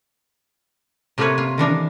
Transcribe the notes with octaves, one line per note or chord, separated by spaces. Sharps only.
C3 A3 A#3 F4 B4 C#5
F4
D#3 E3 D4 A#4